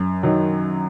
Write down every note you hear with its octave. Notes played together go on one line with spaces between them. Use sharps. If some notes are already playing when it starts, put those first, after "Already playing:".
Already playing: F#2
D#3 F#3